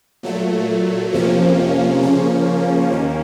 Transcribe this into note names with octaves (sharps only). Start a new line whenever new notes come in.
A#2 F#3 A3
F2 C3 F3 A#3 C#4
C#3 F3 A#3 C#4
D#2 D#3 A#3 C#4